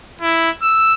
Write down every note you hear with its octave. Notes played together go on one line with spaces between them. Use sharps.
E4
E6